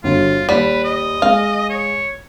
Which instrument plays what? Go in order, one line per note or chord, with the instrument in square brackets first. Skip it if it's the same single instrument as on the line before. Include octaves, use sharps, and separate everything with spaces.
[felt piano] G1 D3 F#4 [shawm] F4
[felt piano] D#2 [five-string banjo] G3 [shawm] B4
[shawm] D#5
[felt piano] G#3 [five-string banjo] F5
[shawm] C#5